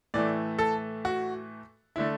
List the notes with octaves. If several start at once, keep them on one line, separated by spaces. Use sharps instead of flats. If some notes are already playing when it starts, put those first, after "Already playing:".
A2 E3 A3 D5
A4
F#4
D3 A3 E4